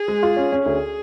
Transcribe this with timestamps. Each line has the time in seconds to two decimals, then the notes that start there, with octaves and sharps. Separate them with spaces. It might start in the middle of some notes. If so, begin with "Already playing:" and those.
Already playing: G#4
0.08 G#3
0.23 F4
0.37 C#4
0.52 C#4
0.66 D2 G#4